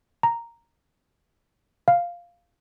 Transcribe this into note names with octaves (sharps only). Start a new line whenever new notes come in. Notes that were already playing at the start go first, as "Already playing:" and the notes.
A#5
F5